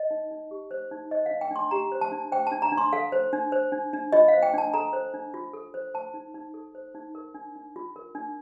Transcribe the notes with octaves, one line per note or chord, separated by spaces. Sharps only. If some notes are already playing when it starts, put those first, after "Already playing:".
Already playing: D#5
D#4
D#4
G4
C5
D#4
C5 D#5
F5
D4
G5
D4 C6
G4 A#5
C5
A5
D4
C5 G5
A5
D4
A#5
D4
C6
A4 F5
C5
D4
C5
D4
D4
F4 D#5
F5
C5
G5
D4 A5
A4 A#5
C5
D4
F4
A4
C5
C5 A5
D#4
D#4
A4
C5
D#4
A#4
D4
D4
F4
A#4
D4